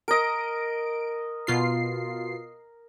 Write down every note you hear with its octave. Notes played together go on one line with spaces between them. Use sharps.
A#4 D#5 D7
B2 F4 C7